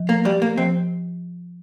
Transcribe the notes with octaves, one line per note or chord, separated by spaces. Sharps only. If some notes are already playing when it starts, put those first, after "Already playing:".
Already playing: F3
A#3
G3 G4
A#3
F3 C4